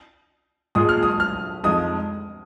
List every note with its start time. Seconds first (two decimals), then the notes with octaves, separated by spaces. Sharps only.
0.75 A#2 G#3 F4 G#4 D#6
0.89 F6
1.03 D#6
1.20 F6
1.64 F2 F3 G#3 D#4 D#6